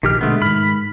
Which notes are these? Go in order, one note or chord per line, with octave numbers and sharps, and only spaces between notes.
A#1 D#3 G4 F6
B2 D3 G#3 A3 B3
G#2 D#3 B5 F6